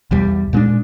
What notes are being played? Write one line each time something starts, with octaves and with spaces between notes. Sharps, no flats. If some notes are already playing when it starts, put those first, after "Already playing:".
B1 E2 G3
A#2 G#3 C4 D4